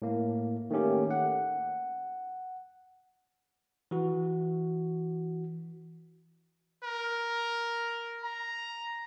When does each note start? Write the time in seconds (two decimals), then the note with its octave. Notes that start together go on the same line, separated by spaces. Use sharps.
0.02 A2 A#3
0.70 D#3 A3 A#3 C#4 G4
1.11 F#5
3.91 E3 F#4
6.84 A#4
8.23 A#5